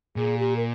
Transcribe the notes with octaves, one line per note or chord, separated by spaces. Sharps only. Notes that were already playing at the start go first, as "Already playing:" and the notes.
A#2 G#4
G4
A#4